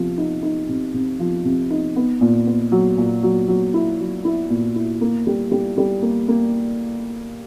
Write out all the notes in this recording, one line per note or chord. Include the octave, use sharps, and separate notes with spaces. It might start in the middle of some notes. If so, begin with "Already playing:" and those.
Already playing: C3 F3
D#4
D#4
C3
C3
F3
C3
D#4
B3
A#2
B3
F#3
A#2
F#3
F#3
E4
F#3
E4
A#2
E4
A#3
G3
G3
G3
A#3
A#3